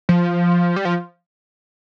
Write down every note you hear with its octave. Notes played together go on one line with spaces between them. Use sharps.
F3
G3
F3